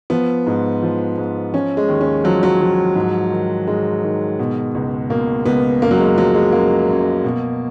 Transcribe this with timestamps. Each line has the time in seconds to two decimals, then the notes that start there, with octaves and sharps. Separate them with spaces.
0.10 F3 B3
0.47 G#2
0.82 F3
1.18 G#2
1.53 F3 C#4
1.77 G#3
1.88 D#2
2.01 C#4
2.24 F3 F#3
2.43 F#3
2.61 F3
2.96 G#2
3.32 D#3
3.67 G#2 G#3
4.04 D#3
4.39 B2
4.75 C#2
5.09 B2 A#3
5.46 C#2 B3
5.82 F#2 A#3
5.91 F#3
5.99 G#3
6.17 F3 F#3
6.35 G#3
6.52 F#2 A#3
6.89 F#2
7.24 B2